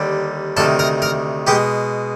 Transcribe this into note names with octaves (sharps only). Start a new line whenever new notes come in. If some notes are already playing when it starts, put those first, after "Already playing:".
Already playing: D#2 D3 G3
D2 C3 D#3 A4 A5
A#4 A#5
A#4 A#5
B2 G#3 G4 G5